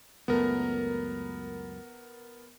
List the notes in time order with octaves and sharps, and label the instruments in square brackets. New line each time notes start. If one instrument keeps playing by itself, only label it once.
[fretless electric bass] C#2 F#2 A3 [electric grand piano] B3 A#4